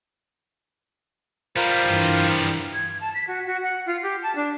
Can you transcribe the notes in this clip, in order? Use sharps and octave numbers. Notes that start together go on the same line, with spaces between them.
G3 B3 F4 A#4 C5
G2 E3
G#6
A5
B6
F#4
F#4
F#5
F4
G4
A5
D4